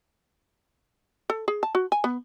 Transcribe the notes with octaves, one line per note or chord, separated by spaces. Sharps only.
A4
G#4
A5
F#4
G#5
B3